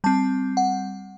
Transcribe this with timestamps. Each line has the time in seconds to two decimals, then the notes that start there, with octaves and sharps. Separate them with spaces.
0.04 G3 C4 A5
0.57 F#5